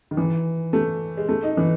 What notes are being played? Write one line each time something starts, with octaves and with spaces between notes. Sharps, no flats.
D#3
E3
A3
G#3
A3
D#4
E3